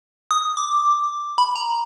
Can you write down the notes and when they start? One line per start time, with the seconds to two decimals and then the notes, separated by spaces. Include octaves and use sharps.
0.31 D#6
0.57 D6
1.38 B5
1.56 A#5